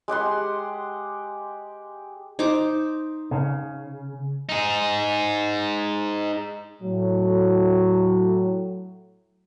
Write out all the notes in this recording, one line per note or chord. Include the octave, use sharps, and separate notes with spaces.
G#3 G4 F#5 C6
D#4 C5 D6
C#3
D#4 G#4
A2 F#3